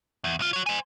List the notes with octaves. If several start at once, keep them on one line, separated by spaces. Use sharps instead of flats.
E2
C2 F4
F#4 C#5
C5 G#5